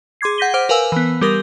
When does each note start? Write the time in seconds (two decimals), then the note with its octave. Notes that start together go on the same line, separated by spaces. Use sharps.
0.21 G#4 C6 D6 G#6 C7
0.38 F#5 G6 A#6 B6 D#7 G7
0.54 C5 F#5 D6 F6 D7
0.69 A#4 B4 F5 G#5 E6
0.92 E3 B3
1.21 G3 G4 A#4 D#6 A#6